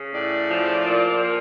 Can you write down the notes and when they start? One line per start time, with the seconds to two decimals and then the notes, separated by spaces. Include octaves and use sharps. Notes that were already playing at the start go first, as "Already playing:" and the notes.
Already playing: C#3
0.13 A2 D5
0.50 F3
0.86 A#2
1.22 A#2